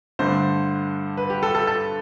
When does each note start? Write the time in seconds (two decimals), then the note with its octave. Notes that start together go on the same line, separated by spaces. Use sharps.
0.19 G2 D3 A3 C5
1.17 B4
1.30 G4
1.43 A4
1.55 A4
1.67 A4